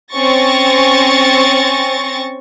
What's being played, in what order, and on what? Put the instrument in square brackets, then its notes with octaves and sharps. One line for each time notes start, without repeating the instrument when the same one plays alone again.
[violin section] C4 C#4 C#6 A6 A#6